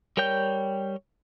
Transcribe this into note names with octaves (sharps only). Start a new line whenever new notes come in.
G3 A#4 C#5 G5 G6